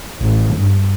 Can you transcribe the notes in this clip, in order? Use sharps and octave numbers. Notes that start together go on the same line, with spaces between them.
A1
G2